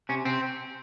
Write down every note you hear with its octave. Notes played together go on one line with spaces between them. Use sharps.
C3 C#4
C3 C4